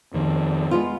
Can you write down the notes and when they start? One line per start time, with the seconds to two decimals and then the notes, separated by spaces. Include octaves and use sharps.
0.14 F2 D#3
0.71 G#3 B3 F4